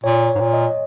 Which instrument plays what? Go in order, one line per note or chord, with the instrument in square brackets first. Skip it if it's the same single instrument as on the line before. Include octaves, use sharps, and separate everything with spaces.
[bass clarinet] A#2 [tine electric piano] C#5
[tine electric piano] C#5
[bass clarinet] G#2
A#2
[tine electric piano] D#5